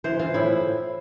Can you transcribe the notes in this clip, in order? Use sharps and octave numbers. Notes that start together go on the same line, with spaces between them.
E3 C5
E3 F4
A2 E4